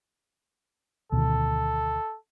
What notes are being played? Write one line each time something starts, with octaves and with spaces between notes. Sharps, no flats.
D2 B2 D#3 A4